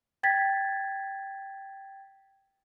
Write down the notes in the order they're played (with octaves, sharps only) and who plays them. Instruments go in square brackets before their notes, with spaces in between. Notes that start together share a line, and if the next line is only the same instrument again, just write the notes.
[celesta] G5 G#6 A6 B6